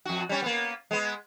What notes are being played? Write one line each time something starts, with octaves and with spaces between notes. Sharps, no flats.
F2 F#4
G3 C#4
A#3 B3
G#3 B3